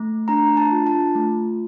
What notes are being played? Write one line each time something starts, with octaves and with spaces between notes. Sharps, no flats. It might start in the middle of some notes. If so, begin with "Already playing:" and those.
Already playing: A3
D4 A#5
A5
F4
A5
A3